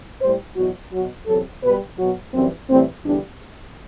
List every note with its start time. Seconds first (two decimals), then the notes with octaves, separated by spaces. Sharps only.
0.22 A2 G3 C5
0.56 E2 B2 F#3 F#4
0.92 B2 F#3 F#4
1.28 E2 C3 F#3 A4
1.63 B2 G3 B4
1.98 B2 F#3 F#4
2.34 F#2 E3 G3 C4
2.69 A2 E3 G3 C4
3.05 E2 D3 G3 D4